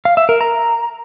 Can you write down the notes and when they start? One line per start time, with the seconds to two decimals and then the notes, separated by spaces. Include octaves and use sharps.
0.05 F5
0.17 E5
0.29 A#4
0.41 A#5